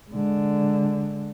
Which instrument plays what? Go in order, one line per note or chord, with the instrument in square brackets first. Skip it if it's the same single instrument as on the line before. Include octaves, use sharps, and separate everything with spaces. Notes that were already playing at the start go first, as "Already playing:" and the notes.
[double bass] D3 G#3